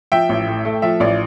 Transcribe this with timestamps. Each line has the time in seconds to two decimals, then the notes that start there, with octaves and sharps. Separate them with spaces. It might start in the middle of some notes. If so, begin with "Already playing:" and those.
0.12 F3 E5 G5
0.29 A1
0.47 A2
0.65 A3
0.82 F3 E5
1.00 A1 D5